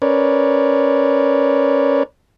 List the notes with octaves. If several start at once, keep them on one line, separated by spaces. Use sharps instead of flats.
C#4 A#4 B4 C#5 D5